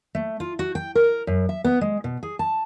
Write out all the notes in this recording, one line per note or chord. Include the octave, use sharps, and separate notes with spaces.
A3
F4
F#4
G5
A#4
F#2
E5
B3
G#3
B2
G#4
A5